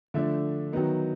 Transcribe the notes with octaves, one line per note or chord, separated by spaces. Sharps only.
D3 F3 A3 D4 E5
D#3 F#3 B3 D#4